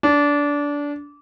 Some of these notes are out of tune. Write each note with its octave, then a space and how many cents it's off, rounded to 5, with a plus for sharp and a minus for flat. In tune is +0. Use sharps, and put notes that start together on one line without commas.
D4 -20